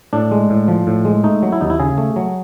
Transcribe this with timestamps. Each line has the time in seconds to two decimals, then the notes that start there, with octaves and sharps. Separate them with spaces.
0.13 A2 D4
0.31 G#3
0.50 A2
0.68 F3
0.87 A2
1.05 G#3
1.24 A3 D#4
1.43 F#3
1.52 E4
1.61 D#2 D#4
1.70 E4
1.80 C#3 G#4
1.98 A3
2.16 F#3